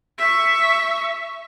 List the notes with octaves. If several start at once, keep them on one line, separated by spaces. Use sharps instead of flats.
E5 C#6